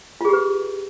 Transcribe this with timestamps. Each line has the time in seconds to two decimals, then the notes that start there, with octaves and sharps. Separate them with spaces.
0.21 F4
0.25 G#4
0.29 G4
0.33 B4